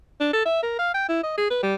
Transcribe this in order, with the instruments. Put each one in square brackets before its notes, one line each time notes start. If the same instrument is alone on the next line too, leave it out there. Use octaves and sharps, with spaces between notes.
[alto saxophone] D4
A4
E5
A#4
F5
G5
E4
D#5
G#4
B4
G3